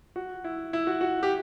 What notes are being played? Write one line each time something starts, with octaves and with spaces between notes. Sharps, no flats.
F#4
E4
E4
F#4
F#4
G4